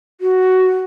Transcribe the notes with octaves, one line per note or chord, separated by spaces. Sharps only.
F#4